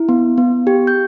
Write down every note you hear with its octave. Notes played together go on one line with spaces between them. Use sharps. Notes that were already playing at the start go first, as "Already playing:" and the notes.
Already playing: E4
B3
B3
G4
G6